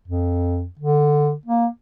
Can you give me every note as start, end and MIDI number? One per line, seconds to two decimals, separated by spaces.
0.08 0.66 41
0.79 1.32 50
1.46 1.66 58